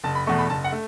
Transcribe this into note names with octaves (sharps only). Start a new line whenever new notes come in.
F#1 A5
B5
E2 B2 A3 C#6
B5
F#1 A5
F#5
A3